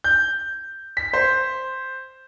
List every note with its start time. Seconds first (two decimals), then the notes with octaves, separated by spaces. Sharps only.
0.04 G6
0.97 B6
1.13 C5